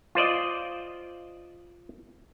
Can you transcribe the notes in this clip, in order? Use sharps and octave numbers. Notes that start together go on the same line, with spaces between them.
F4 C5 D5 D#5